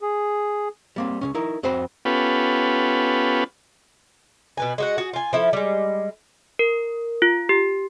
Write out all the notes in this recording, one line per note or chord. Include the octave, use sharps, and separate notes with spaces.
G#4
G3 A#3 C4
C#2 B2 C#4
D#4 E4 A#4
F2 C4 F#4 C5 B5
B3 C#4 F4 G4 A4 B4
B2 B4 G#5
G#3 F#4 F#5
F#4 G#4
F4 G#5
F3 E4 A4
G3 G#3
A#4
F4
G4